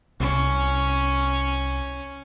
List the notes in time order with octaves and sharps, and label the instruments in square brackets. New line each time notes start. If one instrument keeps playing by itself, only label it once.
[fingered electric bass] C2 [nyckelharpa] C#4